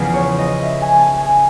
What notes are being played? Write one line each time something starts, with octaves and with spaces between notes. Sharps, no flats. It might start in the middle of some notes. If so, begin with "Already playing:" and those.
Already playing: E2 C#3 F3 B4
C#5
D#5
E5
G#5
A5
G#5